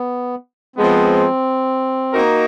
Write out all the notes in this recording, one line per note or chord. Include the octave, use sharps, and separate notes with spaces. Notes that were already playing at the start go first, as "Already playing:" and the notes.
Already playing: B3
F3 G#3 B3 C4
A#3 D#4 F#4 A#4 D#5